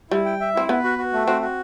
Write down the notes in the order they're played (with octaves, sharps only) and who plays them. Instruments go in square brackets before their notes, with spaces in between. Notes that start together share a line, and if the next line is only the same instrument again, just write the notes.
[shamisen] G3 [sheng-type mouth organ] E4
[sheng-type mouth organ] G5
E5
[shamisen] C4 [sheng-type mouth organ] E4
[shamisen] B3 [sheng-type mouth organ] B4
[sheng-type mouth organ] F#4
F#4
A3
[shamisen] C4 [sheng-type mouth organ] F#4
[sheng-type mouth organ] F#4